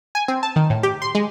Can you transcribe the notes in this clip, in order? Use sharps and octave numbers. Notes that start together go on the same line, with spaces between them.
G#5
C4
A5
D#3
A2
G4
C6
G#3